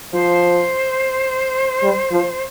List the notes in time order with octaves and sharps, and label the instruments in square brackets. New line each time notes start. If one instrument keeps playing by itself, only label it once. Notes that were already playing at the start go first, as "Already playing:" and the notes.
[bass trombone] F3 [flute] C5
[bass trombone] G3
F3